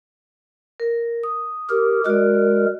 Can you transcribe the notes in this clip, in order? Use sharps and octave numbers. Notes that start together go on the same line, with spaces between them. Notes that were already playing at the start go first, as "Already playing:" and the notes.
A#4
D#6
G4 A#4
G#3 F#4 A#4 D5